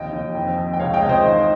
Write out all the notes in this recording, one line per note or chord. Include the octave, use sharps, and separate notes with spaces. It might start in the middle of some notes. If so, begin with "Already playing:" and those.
Already playing: D#2 F3 D#5 G5
D#2
F2
F2
G5
C#2 C#5 F5
D#5 G5
C#2
C5 D#5
D#3